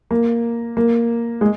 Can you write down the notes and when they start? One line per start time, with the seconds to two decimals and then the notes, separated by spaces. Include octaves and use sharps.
0.11 A#3
0.77 A#3
1.41 G#3